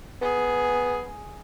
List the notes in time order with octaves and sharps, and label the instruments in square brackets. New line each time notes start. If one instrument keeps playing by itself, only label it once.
[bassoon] B3 [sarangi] G#4